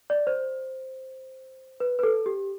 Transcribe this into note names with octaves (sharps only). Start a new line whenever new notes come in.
D5
C5
B4
B4
A4
G4